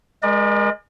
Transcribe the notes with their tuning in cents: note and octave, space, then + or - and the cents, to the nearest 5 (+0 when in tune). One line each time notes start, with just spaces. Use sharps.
G#3 +0 A#4 +35 D5 +40